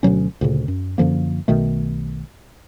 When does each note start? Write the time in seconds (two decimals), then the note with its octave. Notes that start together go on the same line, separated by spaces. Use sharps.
0.03 D2 B2 F#3 C#4
0.41 D2 A#2 C#3
0.68 F#2
0.98 F#2 D3 F3 A#3
1.48 B1 B2 D#3 A3